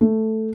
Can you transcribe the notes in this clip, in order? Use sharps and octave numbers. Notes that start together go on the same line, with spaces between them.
A3